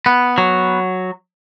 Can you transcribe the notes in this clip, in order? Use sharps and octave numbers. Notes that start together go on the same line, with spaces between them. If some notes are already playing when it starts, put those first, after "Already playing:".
B3
F#3